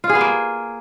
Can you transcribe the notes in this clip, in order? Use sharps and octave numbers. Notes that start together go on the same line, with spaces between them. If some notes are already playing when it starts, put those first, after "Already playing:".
F4
G#4
B3
A#3